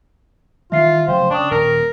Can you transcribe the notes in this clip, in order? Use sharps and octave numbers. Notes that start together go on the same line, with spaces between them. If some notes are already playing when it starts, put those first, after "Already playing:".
D#3 E3 G3 F4 E5 C7
F1 C#3 F#3 C5 F5 G5
C#3 D4 G5 C#6 D#6
D#1 A#4